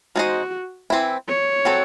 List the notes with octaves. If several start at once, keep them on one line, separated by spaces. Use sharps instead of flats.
G#3 D#4 F#4 A4 C5 D#5
E3 C4 E4
C#5
F#3 C4 F#4 A4